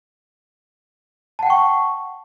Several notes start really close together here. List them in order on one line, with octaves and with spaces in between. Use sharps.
A5 F#5 G5 C#6